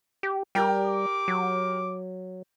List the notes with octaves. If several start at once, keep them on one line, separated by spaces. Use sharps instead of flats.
G4
G3 G4 A#4 G5
D6
F#3